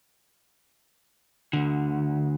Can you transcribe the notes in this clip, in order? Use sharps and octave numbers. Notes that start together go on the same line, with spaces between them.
D2 D3